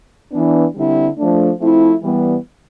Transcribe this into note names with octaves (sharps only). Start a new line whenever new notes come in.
E3 B3 D4
D3 G3 C4 E4
F3 A3 D4
F3 A3 C4 E4
E3 G3 B3